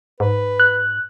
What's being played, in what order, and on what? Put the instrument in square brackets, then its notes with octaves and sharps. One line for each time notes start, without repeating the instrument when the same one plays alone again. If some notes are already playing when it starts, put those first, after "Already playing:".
[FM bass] G#2 [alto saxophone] B4
[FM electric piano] F#6